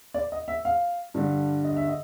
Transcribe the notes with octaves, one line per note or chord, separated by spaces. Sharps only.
D5
D#5
E5
F5
G2 D3 G3
D#5
E5
D#5